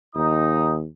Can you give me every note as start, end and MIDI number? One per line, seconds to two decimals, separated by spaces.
0.15 0.87 39
0.15 0.73 63
0.15 0.73 87